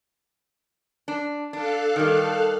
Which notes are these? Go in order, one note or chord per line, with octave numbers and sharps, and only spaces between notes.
D4
D4 A4 F5 F#6
D#3 G3